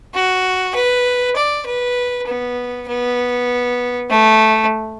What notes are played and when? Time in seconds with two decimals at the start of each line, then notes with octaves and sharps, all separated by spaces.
0.14 F#4
0.75 B4
1.36 D5
1.66 B4
2.27 B3
2.88 B3
4.10 A3